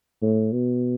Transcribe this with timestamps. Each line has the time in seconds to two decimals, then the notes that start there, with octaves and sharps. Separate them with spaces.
0.22 A2
0.53 B2